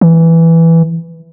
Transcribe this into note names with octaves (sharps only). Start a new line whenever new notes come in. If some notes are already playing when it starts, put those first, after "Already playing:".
E3